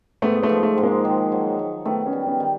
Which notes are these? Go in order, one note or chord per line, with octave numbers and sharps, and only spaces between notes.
G#2 A3 B3
A3 B3
F3
A3
G#2
G#3 A#3
D#3
F#3
F#3
D#3 A3 B3
B3 C#4
G3
B3 C#4
D#3